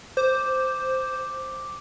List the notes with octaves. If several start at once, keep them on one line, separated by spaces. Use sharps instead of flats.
C5 D6